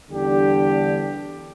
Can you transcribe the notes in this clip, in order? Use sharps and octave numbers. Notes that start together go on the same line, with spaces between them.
E2 D3 G3 D4 G4